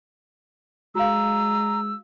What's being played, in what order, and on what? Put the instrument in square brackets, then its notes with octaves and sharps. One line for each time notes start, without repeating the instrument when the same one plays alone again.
[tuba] G#3 [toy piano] F#4 F5 [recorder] A#5 [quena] E6